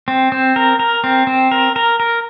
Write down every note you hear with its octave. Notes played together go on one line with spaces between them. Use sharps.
C4
C4
A#4
A#4
C4
C4
A#4
A#4
A#4